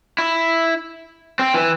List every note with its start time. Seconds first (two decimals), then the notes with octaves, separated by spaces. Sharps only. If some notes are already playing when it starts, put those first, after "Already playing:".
0.18 E4
1.39 C4
1.54 E3